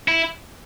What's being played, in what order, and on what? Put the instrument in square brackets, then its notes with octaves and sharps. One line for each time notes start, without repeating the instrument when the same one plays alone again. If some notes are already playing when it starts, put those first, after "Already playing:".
[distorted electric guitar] E4